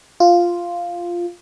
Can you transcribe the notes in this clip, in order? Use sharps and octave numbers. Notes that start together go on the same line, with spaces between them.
F4